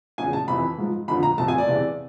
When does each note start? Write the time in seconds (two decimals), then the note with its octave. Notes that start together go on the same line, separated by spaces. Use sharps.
0.18 E2 C#3 F3 G#5
0.33 A5
0.48 F2 C3 E3 B5
0.78 G#2 F3
1.08 F2 D3 F3 B5
1.23 A#5
1.38 F2 C3 F3 A5
1.48 G#5
1.58 D5
1.68 E2 C3 E3